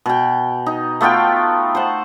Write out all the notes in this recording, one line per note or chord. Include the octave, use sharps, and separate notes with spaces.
B2 G5
D#4
A3 B3 F4 G5
C5 F#5